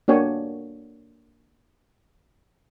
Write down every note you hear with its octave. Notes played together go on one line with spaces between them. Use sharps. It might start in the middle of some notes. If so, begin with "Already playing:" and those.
A#3 D4 F#4 C#5 G5 G#5